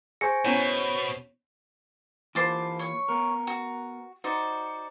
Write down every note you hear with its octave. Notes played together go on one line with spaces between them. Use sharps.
G#4 C5 G#5 C#6 A#6 C#7
B2 B3 C#4 E4 C#5
E3 A#3 F4 C5 A5 D6
C#5 C#6
B3 A#4
F#4
D#4 F#4 C5 D5